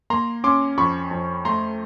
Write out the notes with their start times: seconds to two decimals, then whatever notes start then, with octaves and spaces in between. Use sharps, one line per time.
0.10 A#3 A#5 C6
0.44 C#4 C6 D6
0.77 F2 B5 C#6
1.11 F2
1.45 A3 A#5 C6